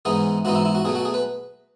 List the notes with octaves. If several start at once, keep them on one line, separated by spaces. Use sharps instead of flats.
G#2 E3 B3 D#4 G#4
G#2 E3 B3 D#4 F#4
E4
E4
F#4
B2 F#3 A3 G#4
F#4
G#4
B4